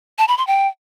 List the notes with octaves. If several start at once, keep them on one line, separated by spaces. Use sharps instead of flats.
A5
B5
C6
G5